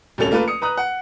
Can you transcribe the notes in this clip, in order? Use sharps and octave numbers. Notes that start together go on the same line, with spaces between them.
D1 C2 C#4 A4 F7
A3 A#3 F4 A4 B4
D#6 C#7
B4 A#5 D#6 F#6
F#5